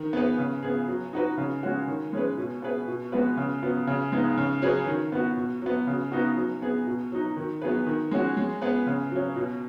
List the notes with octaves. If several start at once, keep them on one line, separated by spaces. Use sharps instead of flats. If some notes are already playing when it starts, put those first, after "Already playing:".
Already playing: D#3
B3 G#4 B4
C#3
B3 G#4
F#3
D#4 F#4 B4
C#3
G#3 C#4 F#4
D#3
G#3 C#4 G#4 B4
B2
B3 G#4 B4
B2
G#3 B3 F#4 B4
C#3
F#3 B3
C#3
G#3 B3 D#4
C#3
F#3 C#4 G#4 B4
D#3
B3 F#4
B2
F#3 B3
C#3
B3 D#4 F#4
F#3
B3 G#4
B2
F#3 D#4
D#3
F#3 B3 G#4 B4
D#3
G#3 C#4 F#4
G#3
B3 G#4 B4
C#3
F#3 C#4
B2